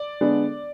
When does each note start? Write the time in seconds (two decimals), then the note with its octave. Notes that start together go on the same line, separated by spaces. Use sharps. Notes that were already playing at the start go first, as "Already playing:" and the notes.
Already playing: D5
0.21 D3 G#3 B3 D4